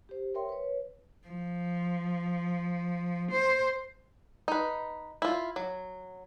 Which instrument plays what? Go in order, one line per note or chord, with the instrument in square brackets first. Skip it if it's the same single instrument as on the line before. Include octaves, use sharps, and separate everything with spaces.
[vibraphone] G4 C5
A#4 C5 C#5 E5 G5 C6
B4 C#5
[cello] F3
C5
[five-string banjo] D#4 B4
E4 F4
F#3